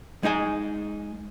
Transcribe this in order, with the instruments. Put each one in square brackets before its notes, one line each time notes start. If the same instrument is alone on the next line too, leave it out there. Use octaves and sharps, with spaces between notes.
[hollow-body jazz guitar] G#3 D#4 D#5 G#5